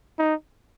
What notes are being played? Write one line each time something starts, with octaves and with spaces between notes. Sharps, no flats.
D#4